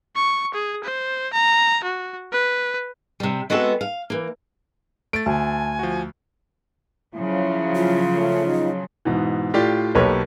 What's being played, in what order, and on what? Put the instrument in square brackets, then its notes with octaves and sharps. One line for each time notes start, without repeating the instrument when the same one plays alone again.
[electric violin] C#6
G#4
C5
A#5
F#4
B4
[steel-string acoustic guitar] C3 G3
G#3 B3 C4 F#4 A4
F5
E3 A#3
[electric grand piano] A3 A6 [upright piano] D7
[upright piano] D2 [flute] G#5 [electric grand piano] A5
[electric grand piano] F3 F#4
[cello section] C#3 F3 F#3 [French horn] E4
[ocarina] F4
[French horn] A3
D#4
[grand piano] G#2 B2 E3
A2 F4 G4 D5
B1 A#3 G4 A4 B4 C#5